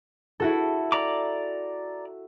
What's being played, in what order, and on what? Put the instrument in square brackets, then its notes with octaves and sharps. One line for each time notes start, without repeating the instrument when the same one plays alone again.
[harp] E4 F#4 A4
[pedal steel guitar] D5 A#5 D6